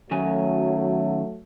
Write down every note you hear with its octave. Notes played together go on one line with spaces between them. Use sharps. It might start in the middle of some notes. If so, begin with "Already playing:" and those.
D#3 F#3 A3 C#4 G#5